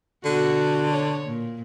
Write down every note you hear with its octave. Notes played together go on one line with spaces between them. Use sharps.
B2 D3 F#4
C#5
A#2